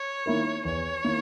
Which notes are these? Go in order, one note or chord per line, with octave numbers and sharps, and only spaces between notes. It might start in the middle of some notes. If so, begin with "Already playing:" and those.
Already playing: C#5
D#3 A#3 E4 A#4
E2 C#5
D#3 A#3 E4 A#4